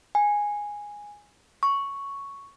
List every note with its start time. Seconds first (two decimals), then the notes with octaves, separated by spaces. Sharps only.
0.15 G#5
1.63 C#6